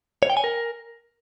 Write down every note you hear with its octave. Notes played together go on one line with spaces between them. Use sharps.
C#5
G5
G#5
A#4